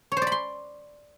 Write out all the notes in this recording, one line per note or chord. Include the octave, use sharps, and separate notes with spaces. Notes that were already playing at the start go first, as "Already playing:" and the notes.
C#5
C5
D5
B5
C6